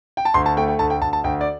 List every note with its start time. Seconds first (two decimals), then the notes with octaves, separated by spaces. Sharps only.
0.17 G5
0.25 A5
0.34 D2 C6
0.46 A5
0.57 A3 G5
0.68 G5
0.79 D2 A5
0.90 G5
1.02 D2 A5
1.13 A5
1.24 D2 G5
1.41 D5